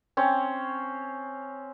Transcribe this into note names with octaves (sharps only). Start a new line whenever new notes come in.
C4 C#4